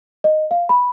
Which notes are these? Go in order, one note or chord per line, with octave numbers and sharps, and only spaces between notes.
D#5
F5
B5